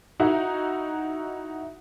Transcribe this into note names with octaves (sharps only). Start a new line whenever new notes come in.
D#4 E4 F#4